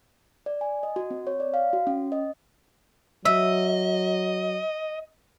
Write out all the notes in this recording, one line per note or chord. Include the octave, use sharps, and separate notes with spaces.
D5
G#5
D#5
F#4
C4
C#5
D5
F5
F#4
C#4
D#5
F#3 D#5 E5